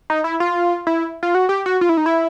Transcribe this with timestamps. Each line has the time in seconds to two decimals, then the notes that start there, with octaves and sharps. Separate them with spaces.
0.10 D#4
0.24 E4
0.40 F4
0.87 E4
1.23 F4
1.35 F#4
1.49 G4
1.66 F#4
1.81 F4
1.89 E4
1.97 D#4
2.06 E4